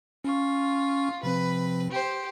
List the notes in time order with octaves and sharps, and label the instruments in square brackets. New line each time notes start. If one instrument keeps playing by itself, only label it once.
[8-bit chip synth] C#4 C#6 [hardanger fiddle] F4
[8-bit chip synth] C3 F3 C4 [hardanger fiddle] B4
[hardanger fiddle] G4 C5